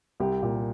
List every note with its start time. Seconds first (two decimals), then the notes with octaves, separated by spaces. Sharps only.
0.20 C2 G4
0.43 A#2